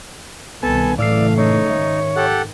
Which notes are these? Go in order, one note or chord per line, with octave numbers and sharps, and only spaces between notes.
C2 B2 D#3 B3 A4 G#5 A5
F#1 A2 E3 A3 D5 F5 E6 C7
D#4 C#5
G#2 D#3 E5
G4 A4 F#5